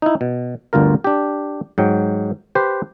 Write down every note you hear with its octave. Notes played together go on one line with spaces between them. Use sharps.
D#4 E4
B2
G1 D2 G2 F4 A#4
D4 G4
G#2 F#3 G5
G4 B4 C5